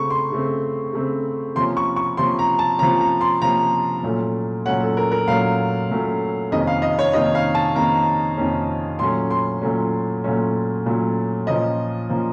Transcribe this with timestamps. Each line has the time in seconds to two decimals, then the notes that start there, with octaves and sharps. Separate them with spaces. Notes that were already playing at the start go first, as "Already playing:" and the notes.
Already playing: C#3 A3 C4 C#6
0.10 C6
0.32 C#3 A3 C4
0.93 C#3 A3 C4
1.55 C3 F3 A#3 C#4 C6
1.77 C#6
1.96 C#6
2.17 C3 F3 A#3 C#4 C6
2.39 A#5
2.59 A5
2.79 C3 F3 A#3 C#4 A#5
3.01 A#5
3.21 C6
3.42 C3 F3 A#3 C#4 A#5
4.03 A#2 F#3 A3 C#4
4.66 A#2 F#3 A3 C#4 F#5
4.81 A4
4.97 A#4
5.12 A#4
5.28 A#2 F#3 A3 C#4 F5
5.89 A#2 F#3 A3 C#4
6.51 F2 C3 D#3 A#3 C#4 D#5
6.67 F5
6.82 D#5
6.99 C#5
7.13 F2 C3 D#3 A#3 C#4 D#5
7.35 F5
7.55 A5
7.75 F2 C3 D#3 A#3 C#4 A#5
8.37 F2 C3 D#3 A#3 C#4
8.99 A#2 F#3 A3 C#4 C6
9.31 C6
9.62 A#2 F#3 A3 C#4
10.24 A#2 F#3 A3 C#4
10.86 A#2 F#3 A3 C#4
11.47 A#2 F3 A#3 C#4 D#5
12.09 A#2 F3 A#3 C#4